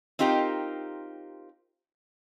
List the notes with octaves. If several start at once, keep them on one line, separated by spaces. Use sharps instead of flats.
C4 D#4 F4 G4 A#4